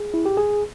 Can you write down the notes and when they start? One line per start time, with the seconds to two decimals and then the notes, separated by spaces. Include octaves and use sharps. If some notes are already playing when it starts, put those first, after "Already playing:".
Already playing: G#4
0.14 E4
0.26 G4
0.37 G#4